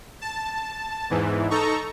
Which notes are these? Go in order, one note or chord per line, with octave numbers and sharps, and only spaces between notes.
A5
E2 G#2 E3
D#4 A4 A#5 C#6